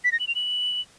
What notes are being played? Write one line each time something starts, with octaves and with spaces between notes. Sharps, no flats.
B6
A#6
F#7
F7
F#7